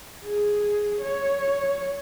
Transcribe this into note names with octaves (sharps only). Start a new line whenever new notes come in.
G#4
C#5